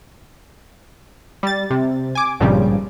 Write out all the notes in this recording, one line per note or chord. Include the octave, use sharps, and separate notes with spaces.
G3 A6
C3
G#5 D6
G#1 G2 A#2 C#3 F3 G3